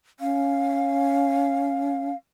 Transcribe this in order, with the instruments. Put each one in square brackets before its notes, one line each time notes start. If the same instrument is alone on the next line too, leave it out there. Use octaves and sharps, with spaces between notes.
[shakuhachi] C#4 [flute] F5